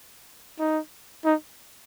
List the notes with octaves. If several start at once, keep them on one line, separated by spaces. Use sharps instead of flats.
D#4
D#4